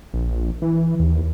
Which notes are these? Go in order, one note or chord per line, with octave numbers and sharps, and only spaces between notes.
A#1
E3
D#2